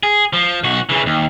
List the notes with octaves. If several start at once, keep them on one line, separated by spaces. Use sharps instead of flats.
G#4
F3
B1 F#4
C#3 E3
D#2